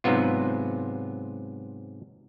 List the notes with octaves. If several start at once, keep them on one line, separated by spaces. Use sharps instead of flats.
G#2 C3 F#3 B3 F4